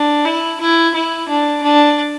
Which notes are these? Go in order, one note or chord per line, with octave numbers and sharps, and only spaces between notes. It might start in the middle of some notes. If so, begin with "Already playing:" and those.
Already playing: D4
E4
E4
E4
D4
D4